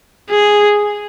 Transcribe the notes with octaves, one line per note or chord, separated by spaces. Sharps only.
G#4